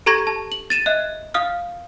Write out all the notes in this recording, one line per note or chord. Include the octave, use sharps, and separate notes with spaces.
G4 A4 A#5 C#6 G#6 A#6
A5
F#7
A6 D#7 E7
D#5 E5 F#6
F5 D#6 F6